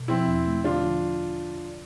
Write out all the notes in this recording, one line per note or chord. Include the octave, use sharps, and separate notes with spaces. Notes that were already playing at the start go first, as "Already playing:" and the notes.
Already playing: B2
F3 C4 E4
E2
A3
D3 D4 F4
F3